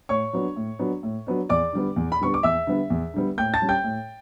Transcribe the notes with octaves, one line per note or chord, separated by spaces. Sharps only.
A2 C#5 C#6
F#3 B3 D4
A2
F#3 B3 D4
A2
F#3 B3 D4
E2 D5 D6
D3 G3 B3
E2
B5
D3 G3 B3 C#6
D6
E2 E5 E6
D3 G3 B3
E2
D3 G3 B3
A2 G5 G6
A5 A6
G3 C#4
G5 G6
A2